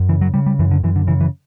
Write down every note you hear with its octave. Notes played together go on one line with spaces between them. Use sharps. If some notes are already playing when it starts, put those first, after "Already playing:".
Already playing: F#2
C#3 E3
F#3
C#3 G3
G3
F#2 E3
D3
F#2 E3
D3
C#3 E3
E3